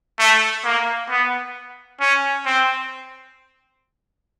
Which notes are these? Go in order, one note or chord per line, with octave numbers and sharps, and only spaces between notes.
A3
A#3
B3
C#4
C4